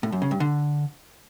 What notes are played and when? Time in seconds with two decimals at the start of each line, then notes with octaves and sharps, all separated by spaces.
0.03 A2
0.12 F#2
0.22 C#3
0.31 G2
0.40 D3